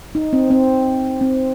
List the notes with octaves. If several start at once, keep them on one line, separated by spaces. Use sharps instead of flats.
D#4
C4
C4
C4